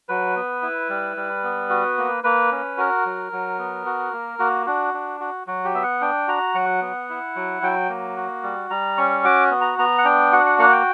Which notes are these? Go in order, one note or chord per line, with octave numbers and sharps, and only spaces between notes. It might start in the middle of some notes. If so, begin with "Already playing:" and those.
F#3 B4
B3
E4
G3
G3
B3
F#4
A#3
A#3 B4
C#4
F#4 A#4
F#3
F#3
B3
F#4
A#3
A#3 F#4
D4 F#4
D4
F#4
F#3 F#4
G4
B3 E5
F#5
D4 G5
F#4 A#5
F#3 F#5
B3
E4
F#3
F#3 G5
A#3
F#4
G3
G3 A#5
C#4 C#6
F#4 D6
B3
A#5
B3 A#5
F#5
D4 G5
F#4 F#5
F#5
A#3 F#5
G5